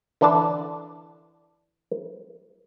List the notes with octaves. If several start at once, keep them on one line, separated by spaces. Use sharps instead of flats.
D3 E3 D4 D5 A5